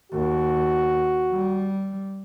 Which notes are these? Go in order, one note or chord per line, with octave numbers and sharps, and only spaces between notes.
D#2 F#4
G3